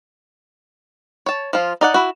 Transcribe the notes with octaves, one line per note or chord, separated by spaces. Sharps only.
C#5 A5
F3 F4
D#4 D5 F#5
E4 F#4